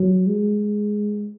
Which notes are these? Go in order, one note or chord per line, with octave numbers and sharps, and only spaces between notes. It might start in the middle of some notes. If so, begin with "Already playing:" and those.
Already playing: F#3
G#3